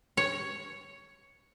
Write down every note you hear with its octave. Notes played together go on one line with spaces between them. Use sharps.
C#5